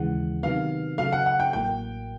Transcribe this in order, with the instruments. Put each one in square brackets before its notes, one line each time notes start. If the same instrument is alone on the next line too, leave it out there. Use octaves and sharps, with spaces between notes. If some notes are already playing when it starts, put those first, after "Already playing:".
Already playing: [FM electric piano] D#2 C#3 E3 G#3 [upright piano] F#5
[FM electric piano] C3 D#3 F#3 B3 [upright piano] F5
[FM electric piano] C#3 F#3 A3 [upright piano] F5
[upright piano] F#5
F#5
G5
[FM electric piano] A1 A2 F#3 A#3 [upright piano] G5